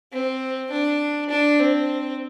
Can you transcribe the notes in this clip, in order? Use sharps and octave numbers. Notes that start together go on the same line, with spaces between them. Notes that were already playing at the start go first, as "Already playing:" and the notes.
C4
D4
D4
C4